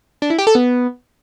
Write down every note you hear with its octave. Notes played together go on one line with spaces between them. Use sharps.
D4
E4
G4
A4
B3